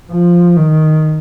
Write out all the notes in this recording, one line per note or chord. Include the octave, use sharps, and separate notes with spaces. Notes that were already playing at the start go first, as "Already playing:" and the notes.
F3
D#3